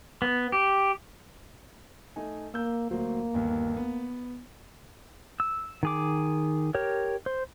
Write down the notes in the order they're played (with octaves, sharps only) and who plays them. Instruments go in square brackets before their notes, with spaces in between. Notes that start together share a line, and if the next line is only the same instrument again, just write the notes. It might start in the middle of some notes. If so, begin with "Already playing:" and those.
[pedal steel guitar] B3
G4
[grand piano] A3 D#4 G#5
[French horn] A#3 [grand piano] E6 G6
[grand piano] D2 F#3 C5 [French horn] A#3
[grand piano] G1 D#2
B3
[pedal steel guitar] E6
D#3 G#4 D6
G4 A#4 C#5
C5